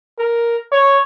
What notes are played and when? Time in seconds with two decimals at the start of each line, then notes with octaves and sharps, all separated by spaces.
0.19 A#4
0.72 C#5